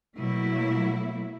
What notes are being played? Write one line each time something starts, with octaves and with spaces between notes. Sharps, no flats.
B2 F#3 A3 A#3 E4